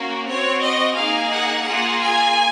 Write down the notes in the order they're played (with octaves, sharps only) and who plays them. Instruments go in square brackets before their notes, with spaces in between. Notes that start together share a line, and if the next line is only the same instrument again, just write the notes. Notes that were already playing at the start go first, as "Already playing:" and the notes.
Already playing: [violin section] A#3 C#4 F#4
C4 F#4 C#5
D#5
A#3 D#4 G#4 F5
F#5
A#3 F4 G#4 F#5
G#5